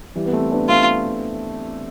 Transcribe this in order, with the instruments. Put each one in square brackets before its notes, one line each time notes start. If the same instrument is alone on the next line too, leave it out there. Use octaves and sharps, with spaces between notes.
[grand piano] E3 G3
B3
A3 C4
B3 D4
[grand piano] A3 C4 [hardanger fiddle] F4